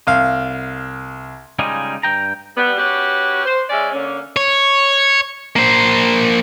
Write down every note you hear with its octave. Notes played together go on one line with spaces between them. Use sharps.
C2 F5
C#3 G3 G#3 D#4 F4 G#4
G2 G5 A#5
G3 B3
C#4 F#4 G4 B4
C5
G#3 C#4 D5 E5
D3 A#3 C#4
C#5
A#3 C5